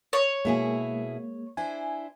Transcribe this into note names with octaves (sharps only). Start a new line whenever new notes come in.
C#5
B2 G#3 A#3 E4 G#4
D4 E4 C5 G#5